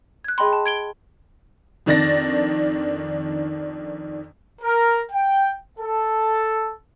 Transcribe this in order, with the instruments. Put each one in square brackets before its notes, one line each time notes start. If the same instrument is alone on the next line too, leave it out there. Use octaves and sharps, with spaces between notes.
[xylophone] F#6 G#6
G#4 D#5 G5 B5 C6
A5
G#6 D7 G7
[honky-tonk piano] F2 D#3 D4 A6 A#6
[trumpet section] A#4
G5
A4